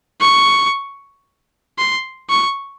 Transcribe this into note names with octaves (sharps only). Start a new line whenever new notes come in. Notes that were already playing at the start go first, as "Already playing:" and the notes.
C#6
C6
C#6